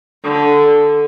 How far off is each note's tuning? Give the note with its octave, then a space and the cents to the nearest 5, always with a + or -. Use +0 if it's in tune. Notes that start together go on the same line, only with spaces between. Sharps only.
D3 -5